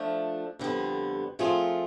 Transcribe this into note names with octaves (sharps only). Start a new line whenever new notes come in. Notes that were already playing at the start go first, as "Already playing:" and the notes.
Already playing: F3 A3 D4
F2 D3 G3 B3
F3 A3 C4 F4 G#4